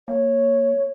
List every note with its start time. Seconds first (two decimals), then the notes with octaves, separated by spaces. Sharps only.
0.08 A#3 C#5